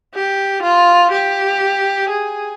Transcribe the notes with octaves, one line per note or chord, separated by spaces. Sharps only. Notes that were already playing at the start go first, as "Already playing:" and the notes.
G4
F4
G4
G#4